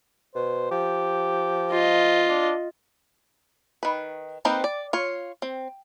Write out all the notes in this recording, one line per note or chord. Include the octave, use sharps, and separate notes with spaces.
B2 C5
F3 G4
F4 D#5
D4
D#3 B4
A#3 C4 D#4 B4 C5
D5
F4 C#5
C4